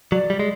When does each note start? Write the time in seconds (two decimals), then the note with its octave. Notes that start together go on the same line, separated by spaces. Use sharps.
0.12 F#3 D5
0.30 G3
0.39 G#3